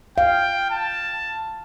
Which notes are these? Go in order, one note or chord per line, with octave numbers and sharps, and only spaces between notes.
F5 G5
A5